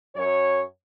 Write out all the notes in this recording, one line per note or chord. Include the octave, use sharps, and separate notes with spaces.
F#2 C#5